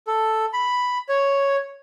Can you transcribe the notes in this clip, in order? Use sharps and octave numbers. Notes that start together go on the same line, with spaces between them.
A4
B5
C#5